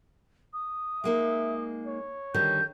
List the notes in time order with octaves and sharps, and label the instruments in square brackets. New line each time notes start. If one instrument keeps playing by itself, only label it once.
[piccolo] D#6
[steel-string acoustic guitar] G#3 A#3 D#4 [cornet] E5
[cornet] C#5
[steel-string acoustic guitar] D3 D#3 G3 [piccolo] G6